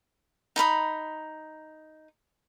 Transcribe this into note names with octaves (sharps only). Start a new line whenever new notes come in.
D#4 A#5 B5 D#6